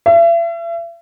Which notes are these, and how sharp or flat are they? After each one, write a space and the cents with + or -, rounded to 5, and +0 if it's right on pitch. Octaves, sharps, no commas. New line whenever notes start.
E5 +40